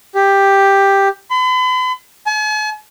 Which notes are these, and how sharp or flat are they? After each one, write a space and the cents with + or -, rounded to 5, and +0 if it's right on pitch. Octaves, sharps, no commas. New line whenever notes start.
G4 +5
B5 +45
G#5 +45